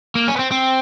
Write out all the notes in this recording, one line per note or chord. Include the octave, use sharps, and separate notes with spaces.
A#3
C#4
B3
C4
C4